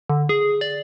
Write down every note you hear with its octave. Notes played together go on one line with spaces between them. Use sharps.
D3
G#4
D5